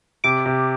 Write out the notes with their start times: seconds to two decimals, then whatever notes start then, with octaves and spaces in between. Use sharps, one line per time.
0.24 C3 D6
0.46 C3